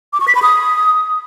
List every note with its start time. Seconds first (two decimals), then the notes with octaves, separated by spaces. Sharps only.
0.13 D6
0.20 C#6
0.28 B6
0.35 B5
0.42 D#6